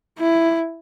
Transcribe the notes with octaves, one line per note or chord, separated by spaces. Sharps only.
E4